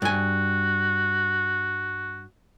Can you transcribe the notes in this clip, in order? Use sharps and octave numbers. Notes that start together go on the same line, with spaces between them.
G2 F#4 G#5